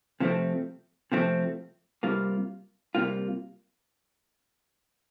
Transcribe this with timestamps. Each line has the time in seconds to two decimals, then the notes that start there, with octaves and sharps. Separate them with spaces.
0.20 C3 F3 A3 C4
1.12 C3 F3 A3 C4
2.03 C3 G3 A#3 F4
2.95 C3 G3 A#3 F4